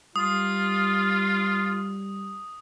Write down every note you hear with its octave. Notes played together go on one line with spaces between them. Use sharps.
G3 F4 D#6